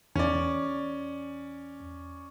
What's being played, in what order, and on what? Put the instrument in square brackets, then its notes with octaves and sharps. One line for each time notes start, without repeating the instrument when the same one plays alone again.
[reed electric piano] E2 [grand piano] C#4 D5